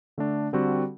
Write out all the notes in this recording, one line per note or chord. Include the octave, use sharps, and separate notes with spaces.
D3 A3 D4
D3 G3 C4 F#4 A4